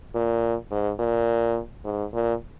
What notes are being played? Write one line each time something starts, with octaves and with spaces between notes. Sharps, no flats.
A#2
G#2
A#2
G#2
A#2